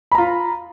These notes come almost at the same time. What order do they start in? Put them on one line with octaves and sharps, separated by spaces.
B5 A#5 F4